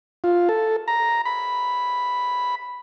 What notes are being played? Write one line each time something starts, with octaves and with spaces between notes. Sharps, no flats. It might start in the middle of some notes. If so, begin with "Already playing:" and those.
F4
A4
A#5
B5